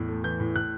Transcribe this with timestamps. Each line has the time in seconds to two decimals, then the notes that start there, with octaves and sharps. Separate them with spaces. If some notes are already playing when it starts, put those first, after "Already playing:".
Already playing: E2 A2
0.09 A3
0.24 E3 G6
0.40 A2
0.56 A2 F#6